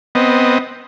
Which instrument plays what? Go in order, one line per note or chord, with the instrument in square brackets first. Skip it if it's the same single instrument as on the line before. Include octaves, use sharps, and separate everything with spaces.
[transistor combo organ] B3 C4 D#5